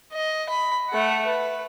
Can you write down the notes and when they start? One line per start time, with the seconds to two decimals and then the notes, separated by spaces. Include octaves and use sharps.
0.13 D#5
0.49 B5
0.90 A3 F#5
1.26 B4